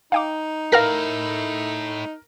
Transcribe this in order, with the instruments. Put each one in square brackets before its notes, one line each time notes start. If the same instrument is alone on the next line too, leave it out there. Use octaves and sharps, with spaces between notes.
[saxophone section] D#4 [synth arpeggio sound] F5 G5 D6
[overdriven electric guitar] A3 E4 [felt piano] A#4 [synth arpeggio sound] F5 F6 A#6